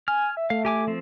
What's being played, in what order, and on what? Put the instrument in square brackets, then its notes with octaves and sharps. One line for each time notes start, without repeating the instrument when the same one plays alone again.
[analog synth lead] G#5 [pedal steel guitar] F6
[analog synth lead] E5
[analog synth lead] A3 [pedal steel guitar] F5
[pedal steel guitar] G4 G#5 D6
F3 C4